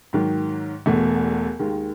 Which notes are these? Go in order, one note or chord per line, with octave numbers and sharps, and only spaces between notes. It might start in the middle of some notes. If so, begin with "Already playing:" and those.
G#2 D#3 F#3
E1 E2 B2 A3
D#2 D#3 G#3